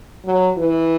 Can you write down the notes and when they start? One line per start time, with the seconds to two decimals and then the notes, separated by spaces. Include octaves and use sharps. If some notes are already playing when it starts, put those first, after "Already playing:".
0.25 F#3
0.57 E3